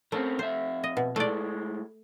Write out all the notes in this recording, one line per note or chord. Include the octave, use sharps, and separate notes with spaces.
A3 C4 C#4 A#4
F2 C5 E5
D#5
B2
A2 G#3 A3 D5